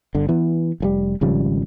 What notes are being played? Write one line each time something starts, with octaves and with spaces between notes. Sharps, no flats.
G1 D3
E3 B3
F1 A2 G3
G#1 C#3 F3 G3